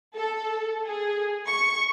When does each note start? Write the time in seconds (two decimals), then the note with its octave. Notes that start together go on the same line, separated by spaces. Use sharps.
0.15 A4
0.85 G#4
1.48 C#6